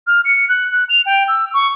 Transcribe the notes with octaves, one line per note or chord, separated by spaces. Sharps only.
F6
C#7
F#6
F#6
F7
G5
E6
C#6